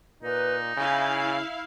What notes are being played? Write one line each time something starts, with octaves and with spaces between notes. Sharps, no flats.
A#2 D#4 B4
C#3 E4 F5 G#5